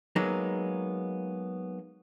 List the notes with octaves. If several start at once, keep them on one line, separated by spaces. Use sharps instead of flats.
F#3 G#3 A#3 B3 D#4